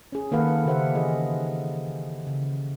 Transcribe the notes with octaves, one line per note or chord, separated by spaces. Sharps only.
C#4 G#4
D#3 A#3 A4 B4 F5 F#5
C#3 A#3 G4 C5 E5 F#5
E3 G#4 D#5
C#3